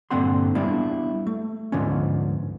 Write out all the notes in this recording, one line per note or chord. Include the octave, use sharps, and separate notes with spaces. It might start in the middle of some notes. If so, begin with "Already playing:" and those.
G2 A#2 D3 C4 F#5 C6
G3 B3 D4 E4 F5
A3
D2 G#2 D3 F3 B3 C#4